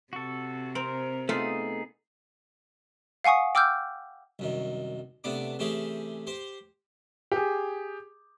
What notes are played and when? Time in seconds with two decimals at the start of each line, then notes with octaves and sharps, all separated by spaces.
0.13 C3 F#4 A4
0.75 C4 A#4
1.29 A3 B3 D#4 F4 G#4
3.24 F5 F#5 G#5 C#6 D#6
3.55 G5 D6 E6 F6 G6
4.39 C2 F#2 D#3
5.24 C3 A3 B3 D4 D6
5.59 C3 E3 A3 C#4 G4 G#4
6.27 G4 C5
7.32 G4 G#4